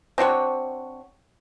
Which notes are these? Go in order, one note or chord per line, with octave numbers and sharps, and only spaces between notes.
C4 D4 F#4 C#5